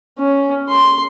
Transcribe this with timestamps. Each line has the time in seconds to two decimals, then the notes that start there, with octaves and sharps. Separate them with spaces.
0.19 C#4
0.69 C6